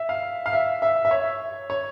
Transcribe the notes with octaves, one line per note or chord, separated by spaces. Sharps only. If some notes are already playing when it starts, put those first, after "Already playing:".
Already playing: E5
F5
F5
E5
E5
E5
C#5
C#5